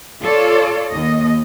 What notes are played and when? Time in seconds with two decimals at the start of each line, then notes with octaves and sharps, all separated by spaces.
0.22 F4 A4 C#5 D5
0.92 D#2 D#5